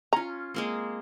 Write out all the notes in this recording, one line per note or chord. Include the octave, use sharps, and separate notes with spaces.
C#4 F4 A#5
G#3 A#3 C4